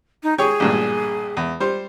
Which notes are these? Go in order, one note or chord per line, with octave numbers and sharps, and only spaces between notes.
D#4
G4 G#4 C#5 C#6
A1 G2 A#2
E2
G3 C5